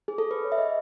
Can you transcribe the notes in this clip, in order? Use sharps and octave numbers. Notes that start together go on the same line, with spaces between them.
G#4
A4
B4
C#5
E5
D#5